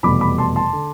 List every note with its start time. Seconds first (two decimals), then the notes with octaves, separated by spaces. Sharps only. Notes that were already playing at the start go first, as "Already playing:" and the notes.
0.03 F1 E2 B2 G3 B5 D6
0.21 B5 D6
0.38 A5 C6
0.56 A5 C6
0.73 D3